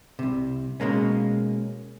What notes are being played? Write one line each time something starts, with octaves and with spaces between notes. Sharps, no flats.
C2 C3
B2 G#3 A#3 C#4